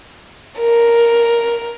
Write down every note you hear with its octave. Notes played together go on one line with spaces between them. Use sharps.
A#4